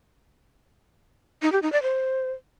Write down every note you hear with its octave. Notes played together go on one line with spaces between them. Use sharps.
D#4
G4
D#4
D5
C5